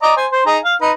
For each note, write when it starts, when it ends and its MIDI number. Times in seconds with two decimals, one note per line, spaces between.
0.03 0.13 74
0.03 0.13 75
0.03 0.13 82
0.17 0.26 72
0.17 0.26 80
0.32 0.43 72
0.46 0.58 63
0.46 0.58 68
0.46 0.58 82
0.64 0.75 77
0.82 0.92 63
0.82 0.92 71